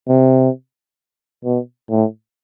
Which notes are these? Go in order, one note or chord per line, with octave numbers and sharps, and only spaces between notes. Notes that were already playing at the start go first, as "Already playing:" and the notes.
C3
B2
A2